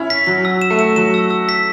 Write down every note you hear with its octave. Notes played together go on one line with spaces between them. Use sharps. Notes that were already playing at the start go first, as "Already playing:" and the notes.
Already playing: C#4 E4
B6
F#3 B6
F#3 E6
E7
A3
E7
F#3 E7
E6
E6
B6